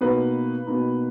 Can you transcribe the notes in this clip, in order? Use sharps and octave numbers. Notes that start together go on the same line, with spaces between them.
B2 A#3 D#4 B4
B2 A#3 D#4